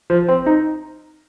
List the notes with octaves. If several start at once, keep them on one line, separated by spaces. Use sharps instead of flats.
F3
C4
D#4